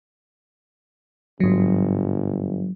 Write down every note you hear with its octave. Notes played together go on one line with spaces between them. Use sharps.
G1 G#2 F#3